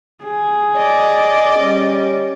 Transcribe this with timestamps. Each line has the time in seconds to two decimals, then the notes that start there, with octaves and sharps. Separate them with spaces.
0.24 G#4
0.76 D5 D#5
1.59 G3 C#4